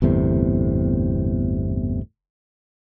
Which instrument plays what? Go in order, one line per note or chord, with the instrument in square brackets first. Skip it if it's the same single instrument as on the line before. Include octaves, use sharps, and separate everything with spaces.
[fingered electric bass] G1 E2 A2 C3